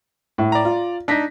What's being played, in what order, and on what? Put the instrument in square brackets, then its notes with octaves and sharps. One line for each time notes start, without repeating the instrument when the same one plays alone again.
[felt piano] A2
[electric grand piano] D5 A#5
[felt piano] F4
[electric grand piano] D4 D#4 [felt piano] A#6 B6